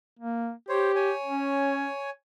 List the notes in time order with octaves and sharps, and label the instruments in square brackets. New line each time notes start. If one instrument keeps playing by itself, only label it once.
[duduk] A#3
[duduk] G4 [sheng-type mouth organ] C5 C#5
[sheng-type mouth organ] C#5 G#5
[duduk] C#4